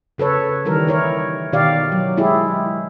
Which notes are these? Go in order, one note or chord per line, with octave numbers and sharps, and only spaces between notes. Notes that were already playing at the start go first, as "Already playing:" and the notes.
C#3 A4 B4 C#5
D#3 E3 G3 A#4
E4 A#4 C#5
B2 D#3 G4 D5 F5
F#3
G#3 E4 G4 G#4